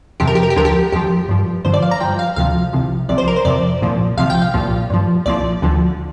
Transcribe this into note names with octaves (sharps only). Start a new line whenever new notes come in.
F2 C3 F3 G4
A#4
G4
A#4
G4
D2 D3 F3 A#4
G4
F2 F3 G4
G2 F3
G2 D3 F3 C5
D5
F5
A#5
G2 F3 G5
F5
D2 C3 F3 F5
C2 C3 F3
C2 C3 F3 D5
C5
A#4
C5
F2 C3 F3 D5
C2 A#2 F3
C2 C3 F3 F5
G5
F5
C2 A#2 F3
G2 F3
C2 A#2 F3 D5
D2 D3 F3